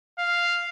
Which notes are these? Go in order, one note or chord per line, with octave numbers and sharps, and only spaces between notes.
F5